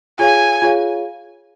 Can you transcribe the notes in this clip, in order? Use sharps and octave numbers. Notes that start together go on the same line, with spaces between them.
F4 G#4 C#5 F5 G#5
F4 G#4 C#5 F5